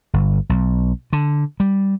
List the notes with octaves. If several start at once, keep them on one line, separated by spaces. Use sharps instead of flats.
G1
B1
D3
G3